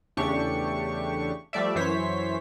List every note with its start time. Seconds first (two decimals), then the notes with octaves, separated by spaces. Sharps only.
0.17 E2 C#3 A3 D4 G4 C#6
1.53 F3 G3 A3 D5 E5
1.75 F#2 E3 C5 C#5 B6